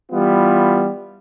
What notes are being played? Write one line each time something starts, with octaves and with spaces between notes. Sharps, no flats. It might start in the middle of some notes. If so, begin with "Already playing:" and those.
E3 G3 B3 F4